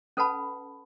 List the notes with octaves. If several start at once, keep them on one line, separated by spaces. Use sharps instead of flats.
C#4 A4 B4 F#5 A5 B5